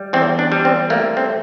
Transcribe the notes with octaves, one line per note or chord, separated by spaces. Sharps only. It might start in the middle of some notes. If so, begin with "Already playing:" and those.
Already playing: G3
E2 C4
D4
G3
C4
A3 A#3
C4